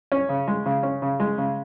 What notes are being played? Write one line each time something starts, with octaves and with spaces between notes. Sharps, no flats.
C#4
C#3
G#3
C#3
C#4
C#3
G#3
C#3